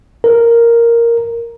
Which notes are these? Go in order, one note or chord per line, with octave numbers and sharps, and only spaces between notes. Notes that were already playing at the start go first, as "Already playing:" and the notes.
A#4